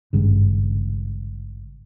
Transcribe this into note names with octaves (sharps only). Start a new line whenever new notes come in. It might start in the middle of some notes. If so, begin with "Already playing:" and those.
G#1 G2 C#3